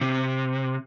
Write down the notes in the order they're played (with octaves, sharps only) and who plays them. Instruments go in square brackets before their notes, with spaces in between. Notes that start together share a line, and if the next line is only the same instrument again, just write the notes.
[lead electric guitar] C3